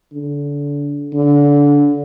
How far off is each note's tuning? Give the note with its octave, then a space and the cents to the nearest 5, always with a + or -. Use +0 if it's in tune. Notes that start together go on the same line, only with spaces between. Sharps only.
D3 -30
D3 -25